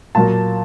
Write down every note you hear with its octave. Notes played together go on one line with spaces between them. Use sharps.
A#2 F#3 A#3 A5